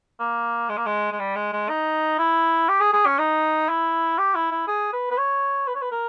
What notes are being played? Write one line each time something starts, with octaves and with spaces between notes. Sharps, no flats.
A#3
G#3
A#3
G#3
G#3
G3
G#3
G#3
D#4
E4
G4
G#4
G#4
C#4
D#4
E4
G4
E4
E4
G#4
B4
B4
C#5
B4
C#5
B4
A#4